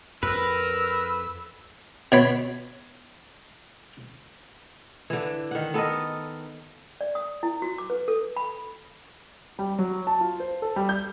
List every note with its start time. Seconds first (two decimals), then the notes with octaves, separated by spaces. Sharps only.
0.23 F2 A#4 B4 E6
2.12 B2 C#5 B5
5.10 D3 E3
5.51 D#3 F#5
5.74 B3 A4 A#4 D#5
7.01 D5
7.15 D#6
7.43 E4
7.62 F#4
7.78 D6
7.90 B4
8.08 A4
8.37 B5
9.59 G3
9.79 F#3
10.07 A5
10.21 F4
10.40 C5
10.62 A4
10.76 G3
10.89 G6